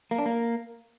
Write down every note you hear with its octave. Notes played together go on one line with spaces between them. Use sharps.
A#3
D4
A#3